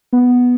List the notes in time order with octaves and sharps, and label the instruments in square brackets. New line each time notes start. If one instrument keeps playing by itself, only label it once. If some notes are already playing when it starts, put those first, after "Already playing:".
[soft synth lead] B3